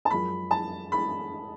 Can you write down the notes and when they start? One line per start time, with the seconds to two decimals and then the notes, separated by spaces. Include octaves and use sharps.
0.05 A5
0.10 F#2 F3 G#3 B5
0.51 A5
0.92 B5